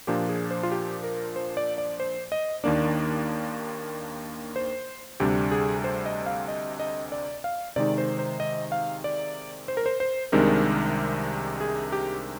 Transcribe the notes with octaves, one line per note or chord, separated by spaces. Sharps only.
A#2 F3 A#3 D4 G4
G#4
C5
F4
G4
A#4
C5
D5
D5
C5
D#5
D#2 D#3 A#3 D4 D5
C5
D2 C3 G3 D4 G4
G#4
C5
D#5
F5
D#5
D#5
D5
F5
C3 D#3 G#3 D#4 D5
C5
C5
D#5
F5
D5
C5
A#4
C5
C5
C2 C3 D#3 G#3 D4 A#4
G#4
G4